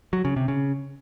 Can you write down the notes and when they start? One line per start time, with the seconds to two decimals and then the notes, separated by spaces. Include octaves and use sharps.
0.13 F#3
0.25 C#3
0.36 C3
0.48 C#3